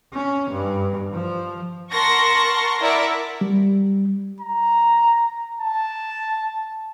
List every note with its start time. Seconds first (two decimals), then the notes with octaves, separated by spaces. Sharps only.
0.13 C#4
0.51 G2
1.13 F3
1.92 A#4 F#5 A5 C6 C#6 A#6
2.80 E4 A#4 D5 E5 F#5
3.41 G3
4.40 A#5
5.60 A5